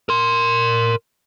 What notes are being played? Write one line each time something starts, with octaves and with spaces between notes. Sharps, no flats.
A#4 C6